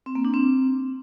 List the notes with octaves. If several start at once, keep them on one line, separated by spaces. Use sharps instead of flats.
C4
A#3
D4
C4